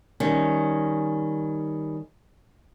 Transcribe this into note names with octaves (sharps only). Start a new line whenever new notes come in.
D#3 G3 C#4